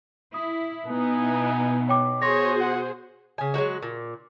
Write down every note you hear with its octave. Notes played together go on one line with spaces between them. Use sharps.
E4 D#6
B2 B3 D#4 E4 G#5
C#5 G5 D6
F#4 G#4 C5 C#5 C6 A#6
F#5
C#3 G#5
F#3 G#3 A#3 F#4
A#2